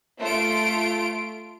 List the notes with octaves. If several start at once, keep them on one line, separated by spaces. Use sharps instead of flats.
A3 F4 D7